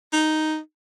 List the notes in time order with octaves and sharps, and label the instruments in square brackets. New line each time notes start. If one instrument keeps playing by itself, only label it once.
[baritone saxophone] D#4